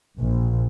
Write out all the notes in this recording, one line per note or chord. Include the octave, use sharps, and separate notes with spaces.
A#1